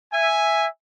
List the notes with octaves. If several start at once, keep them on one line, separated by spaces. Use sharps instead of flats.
E5 G#5